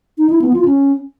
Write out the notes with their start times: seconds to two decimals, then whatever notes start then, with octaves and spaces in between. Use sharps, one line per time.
0.18 D#4
0.30 E4
0.42 B3
0.53 F4
0.65 C#4